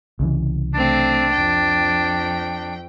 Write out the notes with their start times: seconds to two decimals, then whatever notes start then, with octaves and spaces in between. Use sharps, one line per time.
0.19 C2 C#3 E3
0.74 A3 C4 D4
1.33 F2 G5